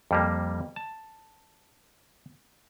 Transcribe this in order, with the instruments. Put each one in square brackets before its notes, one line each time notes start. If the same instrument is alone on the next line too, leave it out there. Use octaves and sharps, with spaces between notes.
[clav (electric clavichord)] F2 G3 A#3
A5